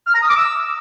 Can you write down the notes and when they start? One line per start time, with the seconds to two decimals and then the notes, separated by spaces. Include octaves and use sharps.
0.07 F6
0.14 A#5
0.21 D#6
0.28 D6
0.36 E6